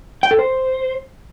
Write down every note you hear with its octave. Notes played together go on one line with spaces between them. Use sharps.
G5
A4
C5